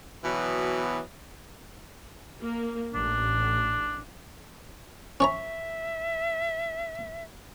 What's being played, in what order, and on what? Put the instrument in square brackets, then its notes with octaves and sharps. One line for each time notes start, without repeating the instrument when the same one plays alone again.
[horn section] B2 E3 F#3 B3
[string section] A#3
[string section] A1 [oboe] D4
[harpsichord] C#4 C#5 A#5 [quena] E5